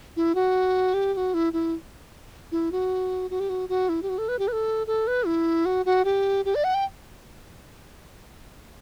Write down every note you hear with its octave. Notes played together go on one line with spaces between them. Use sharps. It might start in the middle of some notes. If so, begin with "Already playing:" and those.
E4
F#4
G4
G4
F#4
E4
E4
E4
F#4
F#4
G4
F#4
F#4
E4
G4
F#4
A4
B4
G4
B4
A4
A4
B4
E4
F#4
F#4
G4
G4
D5
F#5
G5